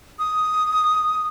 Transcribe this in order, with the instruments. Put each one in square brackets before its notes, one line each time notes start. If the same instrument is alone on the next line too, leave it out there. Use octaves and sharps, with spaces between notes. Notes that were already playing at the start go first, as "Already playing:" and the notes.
[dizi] D#6